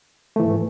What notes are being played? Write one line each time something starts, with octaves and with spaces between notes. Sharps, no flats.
G#2 E3 A3